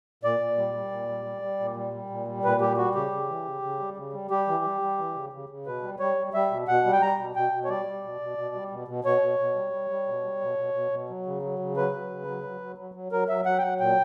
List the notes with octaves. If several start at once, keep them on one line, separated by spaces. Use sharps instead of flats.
A#2 D5
A#2
G3
G3
A#2
G3
G3
G3
A#2
G3
G3
A#2
G3
A#2 B4
G3 G4
G3 F#4
C#3 G4
C#3
E3
C#3
C#3
G3
C#3
G3
G3 G4
E3
G3
G3
E3
C#3
C#3
C#3
B2 B4
G3
G3 C#5
G3
G3 E5
B2
B2 F#5
G3
G5
G3 A#5
B2
B2 G5
B2
C#5
G3 D5
G3
B2
B2
B2
G3
B2
B2
B2 C#5
B2
B2
G3
G3
G3
B2
G3
B2
B2
B2
B2
F#3
C#3
F#3
C#3
F#3 B4
F#3
C#3
F#3
F#3
F#3
F#3
F#3
F#3 A#4
F#3 E5
F#3 F#5
G5
F#3 F#5
A#2 G5